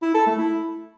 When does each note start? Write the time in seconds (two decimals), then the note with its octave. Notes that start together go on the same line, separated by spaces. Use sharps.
0.02 E4
0.14 A4
0.26 A3
0.38 E4